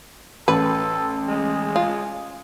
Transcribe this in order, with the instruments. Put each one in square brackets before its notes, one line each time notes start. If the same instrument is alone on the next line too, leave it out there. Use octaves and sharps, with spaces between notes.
[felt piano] A1 [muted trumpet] A4 [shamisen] B4
[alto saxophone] G#3 [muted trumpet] G#4
[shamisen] F4